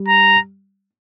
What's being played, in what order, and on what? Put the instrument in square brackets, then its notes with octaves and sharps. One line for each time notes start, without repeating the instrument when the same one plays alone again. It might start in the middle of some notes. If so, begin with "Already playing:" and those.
Already playing: [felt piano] G3
[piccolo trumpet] A#5